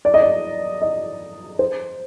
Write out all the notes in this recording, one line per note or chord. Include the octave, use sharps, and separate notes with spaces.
D5
D#5
D5
D#5
C5